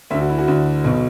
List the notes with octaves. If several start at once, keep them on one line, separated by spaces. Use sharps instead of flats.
D2 D3 E5
F#4
E4
F#4
D2 D3
B1 B2